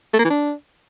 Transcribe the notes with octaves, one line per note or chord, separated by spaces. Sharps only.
A3
A#3
E3
D4